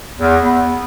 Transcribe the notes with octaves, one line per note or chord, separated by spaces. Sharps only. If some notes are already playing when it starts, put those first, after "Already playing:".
E2
B3